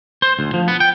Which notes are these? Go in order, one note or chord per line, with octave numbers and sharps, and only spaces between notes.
C5
D2
F3
B3
G5